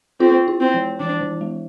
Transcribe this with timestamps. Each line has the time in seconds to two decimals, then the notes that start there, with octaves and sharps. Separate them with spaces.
0.20 C4 F4
0.48 E4
0.60 C4
0.74 F3
1.00 E3 D4
1.21 E3
1.41 G#3